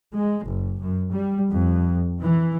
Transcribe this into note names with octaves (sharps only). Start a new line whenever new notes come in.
G#3
F#1
F#2
G3
F2
E3